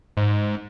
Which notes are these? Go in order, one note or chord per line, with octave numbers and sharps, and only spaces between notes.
G#2